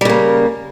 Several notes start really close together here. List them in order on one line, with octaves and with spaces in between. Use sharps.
G3 C#3 A#3